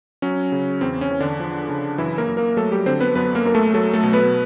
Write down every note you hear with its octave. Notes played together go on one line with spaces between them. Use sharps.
F#3 C#4
C#3
E2 C4
C#4
E2
D3 D4
F3
C#3
F#2 E3 E4
A#3 A#4
F#2
A#3 A#4
F#3 A3 A4
G3 G4
D3 C4 C5
B3 B4
F#2 B3 B4
A#3 A#4
F#2 A#4
A3 A4
F#3 A3 A4
A3 A4
B2
B3 B4